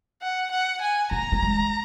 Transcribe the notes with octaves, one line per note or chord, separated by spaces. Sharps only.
F#5
F#5
G#5
A#3 A#5
A#3
G#3